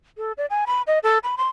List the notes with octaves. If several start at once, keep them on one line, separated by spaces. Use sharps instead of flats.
A4
D5
G#5
B5
D#5
A4
B5
C6